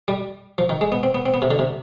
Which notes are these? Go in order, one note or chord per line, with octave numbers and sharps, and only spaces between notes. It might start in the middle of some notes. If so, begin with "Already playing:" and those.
G3
F3
D#3
G#3
B3
C4
B3
C4
B3
C3
D3
C3